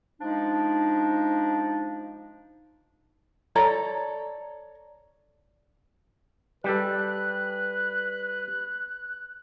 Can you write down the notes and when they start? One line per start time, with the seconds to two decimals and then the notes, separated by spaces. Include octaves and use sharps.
0.21 F3 G#3 D4 D#4
3.55 A4 C#5 D5 A#5
6.64 G3 G4 A4 B4 F#6